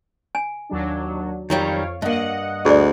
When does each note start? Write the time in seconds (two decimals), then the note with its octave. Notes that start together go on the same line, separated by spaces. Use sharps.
0.35 G#5
0.70 D#2 F#3 D4
1.50 F2 D#3 F#3 G3 C#5 F5
2.02 G2 A#3 D#5 F#5
2.65 D2 G#4 D5